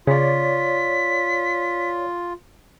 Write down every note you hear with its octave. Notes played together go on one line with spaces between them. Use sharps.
C#3 F4 C#5 D5 B6